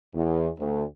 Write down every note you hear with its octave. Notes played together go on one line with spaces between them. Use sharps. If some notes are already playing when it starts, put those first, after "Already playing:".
E2
D2